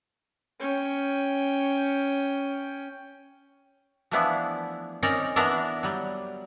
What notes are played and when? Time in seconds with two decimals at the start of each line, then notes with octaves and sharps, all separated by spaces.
0.59 C#4 G5
4.11 E3 F3 A3 B3 D4 E4
5.03 C4 C#4 D#4 A#4 C#5 D5
5.36 E3 B3 D4 A#4 E5
5.83 F#3 G3